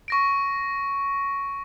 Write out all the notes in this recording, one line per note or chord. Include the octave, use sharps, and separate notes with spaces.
C#6 A#6 D7